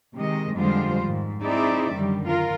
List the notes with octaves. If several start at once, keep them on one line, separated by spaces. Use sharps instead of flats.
C3 D#3 G#3 D#5
F2 D3 G3 G#3 F4 C5
G#2 D#3
C4 D#4 E4 G#4 D5 E5
F#2 D3 D#3 G3
F4 A#4